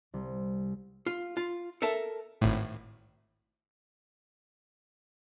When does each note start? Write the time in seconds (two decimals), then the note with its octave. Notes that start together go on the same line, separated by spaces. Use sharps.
0.14 C2
1.06 F4
1.37 F4
1.82 A4 A#4 E5 A5
2.41 G#1 A2